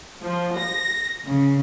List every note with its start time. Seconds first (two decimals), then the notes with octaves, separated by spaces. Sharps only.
0.23 F3
0.57 A#6
1.27 C#3